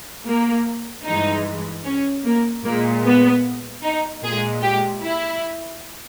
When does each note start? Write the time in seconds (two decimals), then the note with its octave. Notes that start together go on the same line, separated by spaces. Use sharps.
0.26 A#3
1.06 G2 E3 G#3 D#4
1.85 C#4
2.25 A#3
2.64 A#2 G#3 A#3
3.05 B3
3.83 D#4
4.23 A#2 G#3 G#4
4.63 G4
5.02 E4